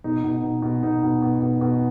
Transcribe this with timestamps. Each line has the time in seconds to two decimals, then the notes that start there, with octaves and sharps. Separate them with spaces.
0.04 B2 D#4
0.24 B2
0.30 D#4
0.43 B2
0.62 B2
0.83 B2 D#4
1.03 B2
1.22 B2
1.42 B2
1.61 B2